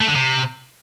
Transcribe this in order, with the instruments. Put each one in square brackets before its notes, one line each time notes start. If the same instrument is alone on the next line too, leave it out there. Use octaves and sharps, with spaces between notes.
[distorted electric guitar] A3
D3
C3